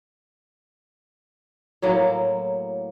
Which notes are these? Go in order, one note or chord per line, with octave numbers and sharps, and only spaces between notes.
A2 F#3 A#3